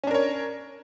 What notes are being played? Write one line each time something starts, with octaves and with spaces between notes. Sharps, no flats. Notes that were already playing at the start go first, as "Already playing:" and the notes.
C#4 D4 A#4 C#5